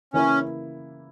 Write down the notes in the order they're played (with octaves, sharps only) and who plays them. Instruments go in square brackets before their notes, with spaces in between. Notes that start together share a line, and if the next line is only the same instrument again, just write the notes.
[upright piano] C#3 E3 A#3 E4 [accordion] C#4